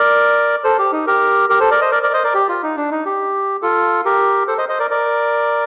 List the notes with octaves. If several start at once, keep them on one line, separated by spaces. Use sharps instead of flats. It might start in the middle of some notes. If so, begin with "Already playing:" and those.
Already playing: A#4 D5
A4 C5
G4
D#4
G4 A#4
G4 A#4
A4 C5
A#4 D5
C5 D#5
A#4 D5
A#4 D5
C5 D#5
A#4 D5
G4
F4
D#4
D4
D#4
G4
F4 A4
G4 A#4
A4 C5
C5 D#5
C5 D#5
A#4 D5
A#4 D5